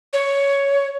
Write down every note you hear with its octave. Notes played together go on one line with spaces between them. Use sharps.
C#5